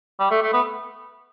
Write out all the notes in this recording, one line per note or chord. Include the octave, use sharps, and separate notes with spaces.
G3
A3
A3
B3